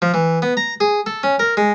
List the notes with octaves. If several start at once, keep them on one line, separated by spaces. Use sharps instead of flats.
F3
E3
B3
A#5
G#4
A4
C#4
A#4
G#3